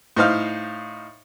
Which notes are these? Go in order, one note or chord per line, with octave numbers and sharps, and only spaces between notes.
A2 D#4 C5 F5